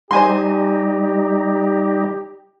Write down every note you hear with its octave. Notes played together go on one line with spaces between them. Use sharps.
G3 D#4 G4 C5 G#5 C6